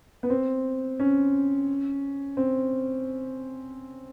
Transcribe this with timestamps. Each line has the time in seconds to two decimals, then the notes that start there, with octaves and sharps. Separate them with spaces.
0.23 B3
0.30 C4
1.00 C#4
2.37 C4